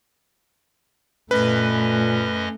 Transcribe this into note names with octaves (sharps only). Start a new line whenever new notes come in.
F#2 A#2 A3 C#4 B4 D#5